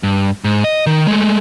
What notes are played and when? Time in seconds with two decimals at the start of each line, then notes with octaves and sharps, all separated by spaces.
0.03 G2
0.44 G#2
0.64 D#5
0.87 D#3
1.07 G#3 A3